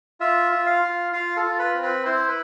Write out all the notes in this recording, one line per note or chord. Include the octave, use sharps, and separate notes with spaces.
F4 E5
F4
F5
F4
F4 F5
A4
F4
B4
C4
B4
E4 C5
B4